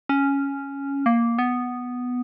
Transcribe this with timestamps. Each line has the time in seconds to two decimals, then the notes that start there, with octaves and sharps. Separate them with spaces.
0.09 C#4
1.06 A#3
1.39 B3